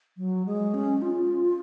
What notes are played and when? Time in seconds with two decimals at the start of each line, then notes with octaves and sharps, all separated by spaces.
0.17 F#3
0.46 G#3
0.74 C#4
1.02 F4